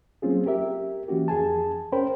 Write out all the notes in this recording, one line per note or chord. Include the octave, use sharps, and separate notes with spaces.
F#3 A#3 C4 C#4 F4 G#4
G4 A#4 E5
E3 A#3 C#4 F#4 G4
F2 G#4 G#5 A5
C#4 A#4 C5 C#5 G5 B5